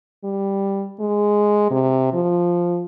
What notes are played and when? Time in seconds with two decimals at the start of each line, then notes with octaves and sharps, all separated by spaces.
0.24 G3
1.00 G#3
1.71 C3
2.14 F3